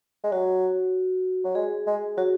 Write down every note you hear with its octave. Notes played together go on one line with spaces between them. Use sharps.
G#3
F#3 F#4
F#3
G#3 G#4
G#3
F#3 F#4